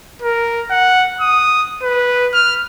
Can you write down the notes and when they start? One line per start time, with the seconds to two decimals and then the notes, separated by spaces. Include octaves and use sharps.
0.22 A#4
0.70 F#5
1.21 D#6
1.83 B4
2.33 F6